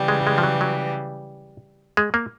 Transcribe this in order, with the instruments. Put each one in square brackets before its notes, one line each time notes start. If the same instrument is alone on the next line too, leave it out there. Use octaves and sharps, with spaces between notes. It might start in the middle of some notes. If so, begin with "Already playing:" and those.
Already playing: [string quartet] C#3 E3 G3
[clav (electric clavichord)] G#3
G#3
F3
F#3
F#3
G#3
A#3